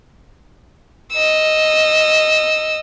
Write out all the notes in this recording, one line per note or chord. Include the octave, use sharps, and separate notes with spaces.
D#5 E6